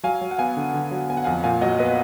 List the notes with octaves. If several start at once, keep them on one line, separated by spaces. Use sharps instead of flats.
F#3 F5 G#5
F#3
F#5
B3 F5 G#5
D3
D3
F#3
B3 G#5
F#5
F2 F5 G#5
A#2 F5 G#5
F#3 D#5 F#5
B3 B4 D#5